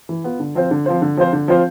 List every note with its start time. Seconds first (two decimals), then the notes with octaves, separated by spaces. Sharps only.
0.09 E3
0.24 B3 F4
0.40 D3
0.55 F3 C4 F4 C5
0.71 D3
0.86 F3 C4 F4 C5
1.02 D3
1.17 F3 C4 F4 C5
1.33 D3
1.48 F3 C4 F4 C5